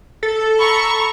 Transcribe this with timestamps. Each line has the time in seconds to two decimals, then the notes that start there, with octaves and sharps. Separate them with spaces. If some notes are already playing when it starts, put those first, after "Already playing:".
0.23 A4
0.59 A#5 B5 C#6